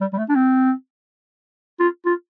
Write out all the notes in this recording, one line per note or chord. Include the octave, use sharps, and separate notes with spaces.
G3
G3
A3
D4
C4
F4
F4